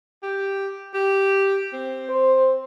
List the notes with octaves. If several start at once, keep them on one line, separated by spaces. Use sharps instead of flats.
G4
G4
C4
C5